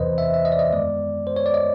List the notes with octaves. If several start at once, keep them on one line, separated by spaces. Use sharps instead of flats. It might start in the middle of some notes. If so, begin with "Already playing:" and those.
Already playing: E2 C3 E3 B4 C5 D#5
E5
E5
D#5
D5
D#5
F#2 D#3 G#3 B3 D5
C5
C#5
D5
D#5